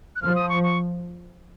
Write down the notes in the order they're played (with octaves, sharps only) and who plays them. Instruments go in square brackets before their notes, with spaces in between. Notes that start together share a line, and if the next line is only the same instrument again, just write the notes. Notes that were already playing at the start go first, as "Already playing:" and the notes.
[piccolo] F#6
[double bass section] F3 [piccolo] F6
[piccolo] D#6
C#6
C#6